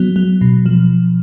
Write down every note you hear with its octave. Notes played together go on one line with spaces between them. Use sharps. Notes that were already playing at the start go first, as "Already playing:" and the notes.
Already playing: F#3 B3
F#3
B2
F3